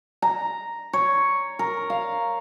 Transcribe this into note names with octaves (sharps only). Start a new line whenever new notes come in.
A#5
C#5
A#4
F5